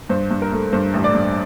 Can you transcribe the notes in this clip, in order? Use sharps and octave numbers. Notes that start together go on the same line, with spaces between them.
G2 C5
G2
A#4
A3
G2 C5
A1
D5
G2